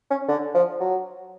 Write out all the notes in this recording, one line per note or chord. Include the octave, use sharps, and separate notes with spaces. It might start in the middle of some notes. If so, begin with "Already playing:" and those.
C#4
D3
F3
F#3